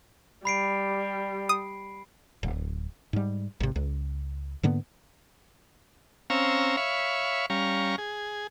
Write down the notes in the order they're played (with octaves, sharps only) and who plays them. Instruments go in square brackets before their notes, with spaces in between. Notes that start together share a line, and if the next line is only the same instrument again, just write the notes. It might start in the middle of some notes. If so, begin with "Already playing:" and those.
[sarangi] G3 [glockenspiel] B5 C7 D7
[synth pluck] D#6
[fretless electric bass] D1
G#2 G3
G#1 C3
C#2
G#2 D3 A#3 B3
[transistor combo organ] C4 C#4 F5 A#5 C#6 E6
C#5 E5 F5 B5 C#6
G3 C#4 F5 A#5 C#6
G#4